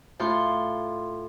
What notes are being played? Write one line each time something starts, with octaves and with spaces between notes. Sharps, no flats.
A2 F4 C6